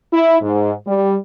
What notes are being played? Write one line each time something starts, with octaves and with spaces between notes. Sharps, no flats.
E4
G#2
G3